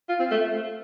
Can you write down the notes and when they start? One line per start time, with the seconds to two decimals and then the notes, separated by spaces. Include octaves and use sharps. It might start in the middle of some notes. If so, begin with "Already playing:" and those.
0.09 F4
0.20 C4
0.31 A3